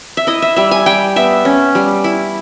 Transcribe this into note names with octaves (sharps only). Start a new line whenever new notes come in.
E5
E4 D#5
E5
G3 E5
G#5
G3 G5
B3 E5
C#4
G3
E4